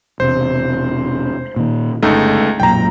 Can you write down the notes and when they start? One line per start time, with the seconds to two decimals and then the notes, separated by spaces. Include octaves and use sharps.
0.20 E1 C3 C5
1.56 A#2 D#3
2.03 G1 C#2 A3 D#4
2.60 B1 F#2 A#2 G5 A#5